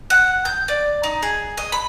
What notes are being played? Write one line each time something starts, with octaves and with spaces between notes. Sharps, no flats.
F#5
G6
D5
D#4
G#4
D#5
B5